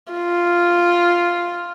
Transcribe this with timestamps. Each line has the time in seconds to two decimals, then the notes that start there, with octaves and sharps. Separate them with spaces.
0.12 F4